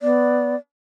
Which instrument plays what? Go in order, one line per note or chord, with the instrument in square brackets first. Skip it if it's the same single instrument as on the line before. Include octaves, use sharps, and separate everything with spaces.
[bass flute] B3 [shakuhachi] D5